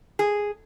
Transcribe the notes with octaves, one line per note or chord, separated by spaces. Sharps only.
G#4